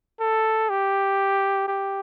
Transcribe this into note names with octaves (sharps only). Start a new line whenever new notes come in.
A4
G4
G4